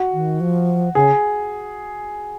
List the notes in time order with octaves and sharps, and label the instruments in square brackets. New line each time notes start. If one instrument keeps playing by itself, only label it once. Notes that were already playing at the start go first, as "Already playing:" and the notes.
Already playing: [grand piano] F#4
[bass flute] D#3
F3
[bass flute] C#3 [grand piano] G#4